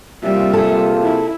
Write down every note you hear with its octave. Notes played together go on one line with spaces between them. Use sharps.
C3 G3 A#3 F4 E5
G#4 A4
E4